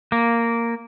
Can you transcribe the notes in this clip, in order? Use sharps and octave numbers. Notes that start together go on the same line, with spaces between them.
A#3